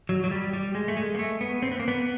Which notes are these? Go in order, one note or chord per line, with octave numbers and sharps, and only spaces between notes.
F#3
F#3
G3
G3
G#3
A3
G#3
A#3
A3
B3
C4
B3
A#3
B3